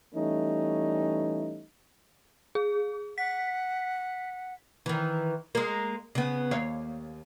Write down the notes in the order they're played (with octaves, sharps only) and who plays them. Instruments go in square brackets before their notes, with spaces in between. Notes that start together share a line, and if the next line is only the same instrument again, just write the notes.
[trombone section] E3 G3 A3 C#4 D#4
[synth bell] G#4
[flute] F#5 [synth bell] B6
[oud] D#3 E3
G#3 A#3
C#3 B3
D#2 C#5 F5